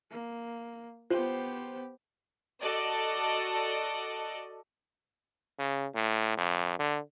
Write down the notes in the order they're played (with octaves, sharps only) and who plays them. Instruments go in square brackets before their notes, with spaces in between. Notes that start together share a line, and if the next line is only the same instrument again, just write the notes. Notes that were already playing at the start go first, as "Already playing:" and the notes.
[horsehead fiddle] A#3
[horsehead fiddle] B3 G4 [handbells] F4 [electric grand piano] C5
[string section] F#4 A4 D5 D#5
[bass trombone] C#3
A2
F2
D3